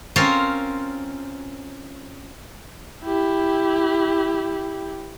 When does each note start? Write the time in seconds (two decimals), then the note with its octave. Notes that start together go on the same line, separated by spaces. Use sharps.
0.16 C4 C#4 F4 A#4 C5 C#5
3.03 E4 G4